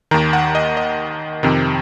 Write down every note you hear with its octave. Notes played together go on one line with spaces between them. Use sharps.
D#2 D#3 A#5
F#5
D#5
D#5
F2 C3 D#3